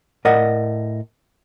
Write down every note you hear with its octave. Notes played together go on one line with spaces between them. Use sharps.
A2 A#4 D5 D#5 F#5